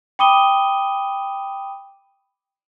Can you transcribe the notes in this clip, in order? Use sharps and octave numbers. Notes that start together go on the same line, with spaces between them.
G5 B5 D6 D#6 D#7 G7